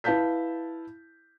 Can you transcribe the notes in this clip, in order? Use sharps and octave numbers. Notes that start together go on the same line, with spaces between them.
E4 B4 F5 A5 G6 B6